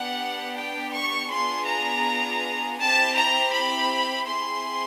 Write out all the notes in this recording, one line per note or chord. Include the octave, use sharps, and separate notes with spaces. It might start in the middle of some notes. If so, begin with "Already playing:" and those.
Already playing: B3 D4 G4 F#5
G5
C#6
B3 D4 F4 G#4 C6
A#5
C4 E4 G4 A5
A#5
B5
C4 E4 G#4 C6